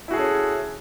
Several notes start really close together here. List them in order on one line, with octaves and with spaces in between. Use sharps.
E4 F#4 G#4 A4 C#4